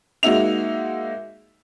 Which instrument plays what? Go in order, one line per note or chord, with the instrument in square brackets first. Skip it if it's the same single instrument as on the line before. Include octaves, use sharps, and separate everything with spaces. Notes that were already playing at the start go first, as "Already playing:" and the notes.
[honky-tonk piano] G#3 A#3 D#4 F#4 E5 F7